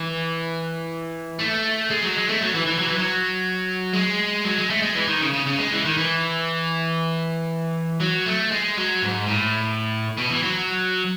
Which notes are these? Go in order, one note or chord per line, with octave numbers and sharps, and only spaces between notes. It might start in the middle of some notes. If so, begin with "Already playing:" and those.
Already playing: E3
A3
G#3
F#3
G#3
A3
F#3
E3
E3
F#3
E3
F#3
G#3
F#3
G#3
A3
G#3
E3
D#3
C#3
C#3
C#3
G#3
E3
D#3
E3
F#3
A3
G#3
F#3
G#2
A2
B2
E3
F#3